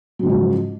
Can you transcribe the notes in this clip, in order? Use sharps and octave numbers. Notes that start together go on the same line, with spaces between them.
G#2 C#3 F3 F#3